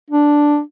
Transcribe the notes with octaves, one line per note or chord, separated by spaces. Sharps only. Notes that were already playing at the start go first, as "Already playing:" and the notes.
D4